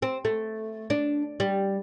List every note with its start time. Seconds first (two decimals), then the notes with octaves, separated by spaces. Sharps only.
0.02 C4
0.25 A3
0.90 D4
1.40 G3